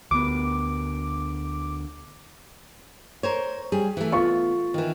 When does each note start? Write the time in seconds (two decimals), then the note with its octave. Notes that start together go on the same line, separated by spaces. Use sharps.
0.11 D2 B3 D6
3.23 A#4 C5 C#5
3.72 G3 G#4
3.97 E3 A3
4.12 B3 F4 C#6
4.74 D#3 E3